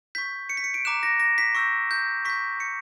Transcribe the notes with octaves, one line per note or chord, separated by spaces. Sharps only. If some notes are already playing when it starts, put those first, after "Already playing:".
C#6 G6 B6
C#7
B6
C#7
D7
A#5 D6 F#6 E7
A#6
A#6
B6
C#6 E6 G6 A#6
G6
C#6 G6 B6
C#7